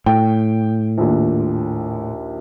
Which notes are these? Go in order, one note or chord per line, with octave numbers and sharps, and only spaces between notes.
A2 G5
A#1 D#2